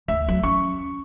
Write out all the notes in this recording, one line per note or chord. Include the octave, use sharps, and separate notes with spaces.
D2 E5
F#3
C#4 C#6